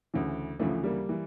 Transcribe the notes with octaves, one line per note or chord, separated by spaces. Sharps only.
D2 C#3 E3
D2 C#3 E3 F3 A3
G3 A#3
E3